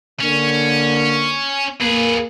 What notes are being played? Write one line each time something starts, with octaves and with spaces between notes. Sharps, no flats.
D3 A#3 C#4
A#3 G#4 B4